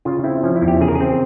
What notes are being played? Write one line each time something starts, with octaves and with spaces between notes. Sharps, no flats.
C#3 F4
C4 E4
F3 C#4
E4
E2
G4
C#3 G#4
A#4
G#4
C4